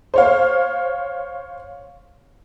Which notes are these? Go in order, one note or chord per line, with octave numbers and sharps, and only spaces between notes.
C5 C#5 F5